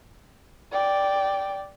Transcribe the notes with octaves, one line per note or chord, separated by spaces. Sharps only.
D5 G5